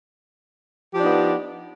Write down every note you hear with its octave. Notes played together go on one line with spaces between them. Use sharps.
F3 B3 D4 D#4 G4